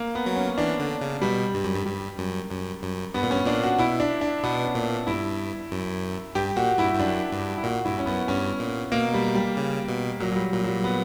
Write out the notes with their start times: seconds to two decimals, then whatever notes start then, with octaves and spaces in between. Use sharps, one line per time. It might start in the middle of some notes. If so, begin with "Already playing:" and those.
Already playing: A#3
0.15 B3
0.26 F#3
0.36 C#4
0.58 E3 D4
0.79 D3
1.01 C#3
1.22 B2 G3
1.54 G2
1.65 F#2
1.75 G2
1.86 G2 G3
2.18 F#2
2.50 F#2
2.82 F#2
3.14 G2 B3
3.23 A#2
3.30 G2 C#4
3.46 A#2 D4
3.63 F#4
3.78 B2 E4
4.00 D4
4.21 D4
4.43 B2 B3
4.64 C#4
4.75 A#2
5.07 G2 E4
5.72 F#2
6.35 G2 G4
6.56 A#2 F#4
6.78 G2 E4
6.93 G2
6.99 F#2 D4
7.32 G2
7.58 E4
7.63 A#2 F#4
7.85 G2 E4
7.99 C#4
8.06 F#2 B3
8.28 G2 C#4
8.60 A#2
8.92 B2 A#3
9.14 G3
9.35 G3
9.57 C#3
9.89 B2
10.20 A#2 F#3
10.32 F#3
10.36 G3
10.53 A#2 F#3
10.64 F#3
10.68 G3
10.84 B3